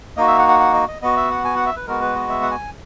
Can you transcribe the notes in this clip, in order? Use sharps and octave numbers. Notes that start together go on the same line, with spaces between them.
A#3 D#4 F#4 D#5
E5
F#5
F#5
F#5
D#5
D#5
B3 F#4 D#5
E5
F#5
G#5
F#5
E5
B4
G#3 B3 F#4 A#4
B4
D#5
E5
F#5
G#5